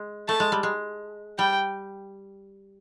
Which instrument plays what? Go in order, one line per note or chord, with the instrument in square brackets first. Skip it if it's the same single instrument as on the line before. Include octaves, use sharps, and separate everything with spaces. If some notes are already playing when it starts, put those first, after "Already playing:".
Already playing: [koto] G#3
[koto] A3 [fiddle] A5
[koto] G#3
G3
G#3
[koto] G3 [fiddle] G5